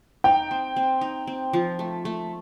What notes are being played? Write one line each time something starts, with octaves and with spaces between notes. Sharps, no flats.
D#4 G5
C4
C4
D#4
C4
F3
A3
A3